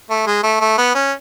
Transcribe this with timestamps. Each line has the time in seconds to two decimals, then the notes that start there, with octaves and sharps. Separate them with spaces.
0.10 A3
0.27 G#3
0.43 A3
0.60 A3
0.78 B3
0.95 C#4